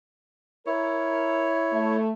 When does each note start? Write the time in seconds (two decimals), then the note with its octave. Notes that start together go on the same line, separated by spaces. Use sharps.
0.66 E4 A#4 C#5
1.71 A3